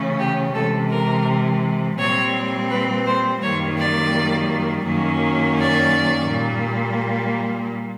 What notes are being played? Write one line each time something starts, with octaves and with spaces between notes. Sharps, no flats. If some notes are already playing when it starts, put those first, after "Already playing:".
Already playing: C#3 E3 A3 C#4
G4
C3 E3 G#3 A4
A#4
A#2 G3 C4 C#5
B4
C5
F#2 D#3 G3 A#3 C#5
D5
F#2 D#3 F#3 A#3 C#4
D5
A#2 G3 A#3